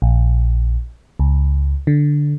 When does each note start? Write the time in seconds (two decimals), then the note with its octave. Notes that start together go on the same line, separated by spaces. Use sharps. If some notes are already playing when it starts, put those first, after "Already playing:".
0.02 A#1
1.19 C#2
1.87 D3